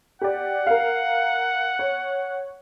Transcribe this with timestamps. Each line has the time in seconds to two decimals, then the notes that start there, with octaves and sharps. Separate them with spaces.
0.21 G4 D5 F#5
0.67 A#4 F5
1.79 C#5